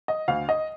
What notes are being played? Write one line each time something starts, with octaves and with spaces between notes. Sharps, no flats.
D#5
D2 F5
D#5